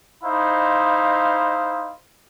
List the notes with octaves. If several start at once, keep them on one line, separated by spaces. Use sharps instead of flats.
D#4 E4 C5 F5